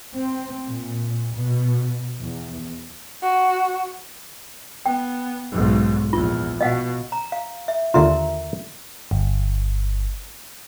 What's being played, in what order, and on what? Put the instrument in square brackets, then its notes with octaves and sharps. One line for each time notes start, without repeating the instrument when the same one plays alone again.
[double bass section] C4
A#2
B2
E2
[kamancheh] F#4
[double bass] B3 [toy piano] G5
[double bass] B1 G#2
[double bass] A#1 E2 [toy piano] F4
[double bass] B2 [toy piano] D#5 F5 F#5
[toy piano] A#5
F5
E5
[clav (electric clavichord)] D#2 D3 F4 [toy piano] A#4 E5 A#5
[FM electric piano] G1